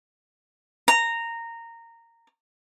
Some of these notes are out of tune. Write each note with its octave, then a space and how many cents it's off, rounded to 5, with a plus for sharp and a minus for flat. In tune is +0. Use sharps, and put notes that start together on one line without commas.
A#5 -15